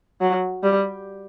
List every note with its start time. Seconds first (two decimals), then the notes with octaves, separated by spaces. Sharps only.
0.21 F#3
0.63 G3